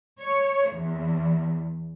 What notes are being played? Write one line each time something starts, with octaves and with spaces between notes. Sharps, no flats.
C#5
E2